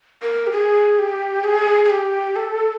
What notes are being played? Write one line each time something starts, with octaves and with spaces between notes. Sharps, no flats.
A#4
G4
G#4
G4
G#4
G#4
G4
A4